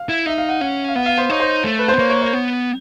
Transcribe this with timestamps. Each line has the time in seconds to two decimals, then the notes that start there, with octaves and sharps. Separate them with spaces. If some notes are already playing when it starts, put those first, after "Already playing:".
Already playing: F5
0.09 E4
0.26 D#4 E5
0.38 F5
0.49 F#5
0.61 C#4 F#5
0.88 F5
0.96 B3 F#5
1.06 F5
1.18 C5
1.30 D#4 C#5
1.40 C5
1.64 A3
1.79 B4
1.88 C5
1.94 B3
1.99 A#3 C#5
2.09 C#5
2.21 C#5
2.33 B3